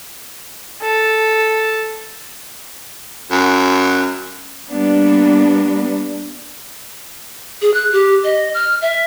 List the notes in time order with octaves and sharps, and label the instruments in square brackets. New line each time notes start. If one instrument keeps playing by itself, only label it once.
[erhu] A4
[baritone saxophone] F#2
[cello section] G3 A#3 B3 D4
[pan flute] G#4
F#6
G4
D#5
F6
E5